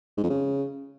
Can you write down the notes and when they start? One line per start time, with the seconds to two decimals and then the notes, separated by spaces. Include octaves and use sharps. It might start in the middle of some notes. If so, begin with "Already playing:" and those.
0.17 G#2
0.24 F2
0.30 C#3